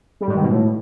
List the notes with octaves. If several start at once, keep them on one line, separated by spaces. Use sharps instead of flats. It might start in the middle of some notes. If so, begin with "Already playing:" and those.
G3
G#2
D#3
B2
A2